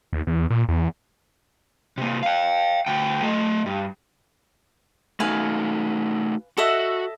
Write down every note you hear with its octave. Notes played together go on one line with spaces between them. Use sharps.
D#2
E2
A#2
E2
C3 A#3
F5 G5
D2 G5
A3 D#5
G2
A3 D#4 F#4 B4 F5 G#5
F#4 A4 D#5 E5